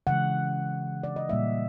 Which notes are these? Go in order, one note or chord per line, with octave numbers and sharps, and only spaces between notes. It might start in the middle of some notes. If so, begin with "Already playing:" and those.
C#3 E3 G#3 F#5
D5
D#5
A#2 G3 A#3 E5